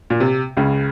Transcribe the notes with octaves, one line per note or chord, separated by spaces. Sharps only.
A#2
C3
C#2 C#3